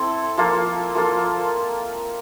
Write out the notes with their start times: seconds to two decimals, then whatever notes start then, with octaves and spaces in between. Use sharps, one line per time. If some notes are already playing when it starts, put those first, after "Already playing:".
Already playing: C4 E4 A4
0.38 F3 A#3 F4 A4
0.95 F3 A#3 F4 A4